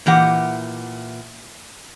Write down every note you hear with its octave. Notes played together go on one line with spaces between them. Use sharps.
A#2 E3 G4 F#5